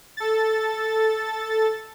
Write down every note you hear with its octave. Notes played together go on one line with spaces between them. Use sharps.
A4 A6